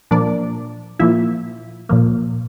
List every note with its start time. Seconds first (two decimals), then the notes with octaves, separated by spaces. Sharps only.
0.11 A#2 F3 A#3 D4 D5
0.99 A#2 F3 A#3 E4 E5
1.89 A#2 F3 A#3